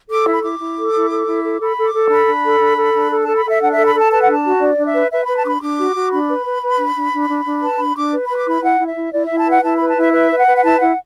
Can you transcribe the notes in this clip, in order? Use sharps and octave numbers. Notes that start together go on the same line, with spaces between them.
A4 D6
E4
B5
E4 D6
E4
A4
E4
A4
E4
A4
A4 B5
A4
D6
A4
D4 B5
D4
A4
D4
A4
D4
A4
A4 A5
B5
A4 E5
D4 F#5
A4 E5
B5
A4 A5
B4 A5
F#5
D4 A5
F#4
D4 D5
D4
E5
B4
B4 E5
B4 B5
A5
D4 B5 D6
D4 D6
F#4
F#4
D4 B5
B4
B4
B4
D4
D4
D4
D4
D4
B4 A5
D4 B5
D4 D6
B4
B4 B5
D6
E4 B5
E4 F#5
E4
E5
E4
E4 D5
E4 E5
A5
B4 F#5
E4 A5
B4 B5
A5
E4 E5
B4 E5
B4
F#5
B4
F#5
E4 A5
E4 F#5